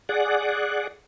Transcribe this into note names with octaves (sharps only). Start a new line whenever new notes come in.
G#4 D5 F#5